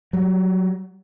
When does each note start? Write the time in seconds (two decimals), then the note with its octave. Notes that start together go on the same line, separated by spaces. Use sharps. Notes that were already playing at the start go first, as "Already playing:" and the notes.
0.13 F#3 G3